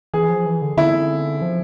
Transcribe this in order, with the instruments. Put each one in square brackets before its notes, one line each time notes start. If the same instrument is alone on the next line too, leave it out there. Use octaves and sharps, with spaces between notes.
[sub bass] E3 [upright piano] G#4
[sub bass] F3
E3
D3
[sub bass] D3 [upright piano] E4
[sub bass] F3